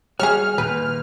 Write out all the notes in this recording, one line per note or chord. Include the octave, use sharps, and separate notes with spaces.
G3 F#4 G#4 C#5 F6
A#2 D#3 B4